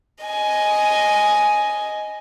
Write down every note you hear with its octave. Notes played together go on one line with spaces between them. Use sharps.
D#5 G#5